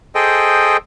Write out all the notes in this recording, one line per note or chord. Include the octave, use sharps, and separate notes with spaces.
G#4 A4 C5 D#5 G5